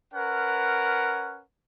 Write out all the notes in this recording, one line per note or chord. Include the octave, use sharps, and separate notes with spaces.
C#4 A#4 B4 F#5